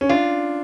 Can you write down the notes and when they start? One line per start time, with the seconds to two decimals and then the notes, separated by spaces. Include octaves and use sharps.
0.01 C#4
0.09 D4 F4